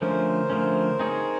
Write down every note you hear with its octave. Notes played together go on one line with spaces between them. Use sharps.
D3 F3 A3 C#4 A#4 C5
D3 F3 A3 C#4
C4 D#4 G#4 C#5